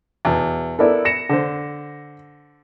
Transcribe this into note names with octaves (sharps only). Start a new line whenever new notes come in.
E2 B2
B3 E4 A4 A#4 D5
A#6 C#7 E7
D3 C5